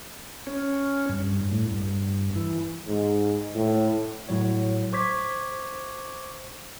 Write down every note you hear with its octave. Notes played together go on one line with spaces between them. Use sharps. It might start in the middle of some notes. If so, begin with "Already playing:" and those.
C#4
G2
A2
G2
E3
G#2
A2
A2 F#3 C#5
C5 C#6 D6 G#6 B6